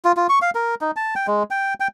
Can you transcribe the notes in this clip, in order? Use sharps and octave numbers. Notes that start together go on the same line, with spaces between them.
F4
F4
C#6
F5
A#4
D#4
A5
G5
G#3
G5
G5